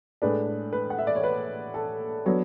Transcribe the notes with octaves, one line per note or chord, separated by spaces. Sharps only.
A2 G#3 D4 B4
B4
F#5
E5
D5
C#5
B4
A4
F#3 B3 D4 A4 C#5